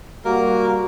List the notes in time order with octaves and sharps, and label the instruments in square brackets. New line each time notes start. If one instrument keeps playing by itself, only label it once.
[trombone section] G3 F#4 [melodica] A#3 A#4